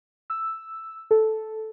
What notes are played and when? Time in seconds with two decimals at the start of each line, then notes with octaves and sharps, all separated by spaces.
0.30 E6
1.11 A4